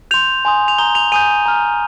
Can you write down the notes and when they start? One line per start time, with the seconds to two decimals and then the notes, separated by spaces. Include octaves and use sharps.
0.11 C6 G6 F7
0.45 G#5 C6 D#6
0.68 F7
0.78 A#5 D#6 G6 G7
0.95 F7
1.12 G#5 D#6 G6 D#7
1.46 A#5 F6